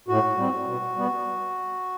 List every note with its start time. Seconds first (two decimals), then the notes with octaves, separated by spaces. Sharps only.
0.08 A2 F#4
0.37 G3 C4
0.66 B2
0.96 G3 B3